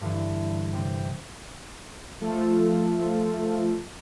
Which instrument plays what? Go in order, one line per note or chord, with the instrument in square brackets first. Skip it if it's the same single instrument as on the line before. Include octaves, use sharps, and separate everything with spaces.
[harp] G2 D3 E3
C3 C4
[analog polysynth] F3 A3 F4 A4